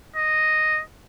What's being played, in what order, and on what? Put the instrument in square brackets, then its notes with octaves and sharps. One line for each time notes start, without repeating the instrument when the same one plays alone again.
[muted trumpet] D#5